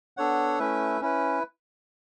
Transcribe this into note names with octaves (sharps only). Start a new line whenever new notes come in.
B3 D4 A4 C#5 F#5
A3 C#4 E4 B4 E5
C#4 E4 B4